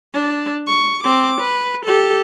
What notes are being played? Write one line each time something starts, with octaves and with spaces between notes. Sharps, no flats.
D4
C#6
C4 D6
B4
G4 A4